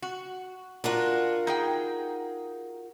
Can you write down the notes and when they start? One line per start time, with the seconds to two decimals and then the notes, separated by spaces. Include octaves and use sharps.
0.02 F#4
0.84 D4 F4 F#4 A#4
1.47 D#4 G#4 G5